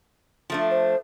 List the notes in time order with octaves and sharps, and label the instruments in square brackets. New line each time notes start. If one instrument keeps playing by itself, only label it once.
[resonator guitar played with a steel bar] F3 A3 D4
[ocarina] C5